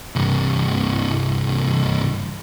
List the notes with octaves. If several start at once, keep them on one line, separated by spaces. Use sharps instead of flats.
C2 G2